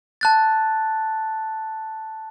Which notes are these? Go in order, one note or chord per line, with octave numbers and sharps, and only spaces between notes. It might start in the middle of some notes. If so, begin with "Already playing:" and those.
A5 F#6 A6